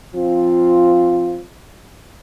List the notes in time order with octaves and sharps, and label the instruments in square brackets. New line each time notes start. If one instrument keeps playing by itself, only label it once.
[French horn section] F3 C4 F4